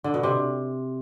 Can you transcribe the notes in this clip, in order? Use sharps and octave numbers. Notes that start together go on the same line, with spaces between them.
D3
B2
C3